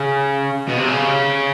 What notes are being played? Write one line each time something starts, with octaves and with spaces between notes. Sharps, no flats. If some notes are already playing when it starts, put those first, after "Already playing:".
Already playing: C#3
B2
C3
C#3